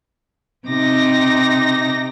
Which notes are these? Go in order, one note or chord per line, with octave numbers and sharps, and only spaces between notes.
C3 D#4 D6 A#6